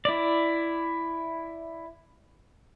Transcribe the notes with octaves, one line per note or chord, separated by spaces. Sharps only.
E4 D5